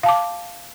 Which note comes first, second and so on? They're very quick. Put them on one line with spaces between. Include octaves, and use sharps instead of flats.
F5 A5 D6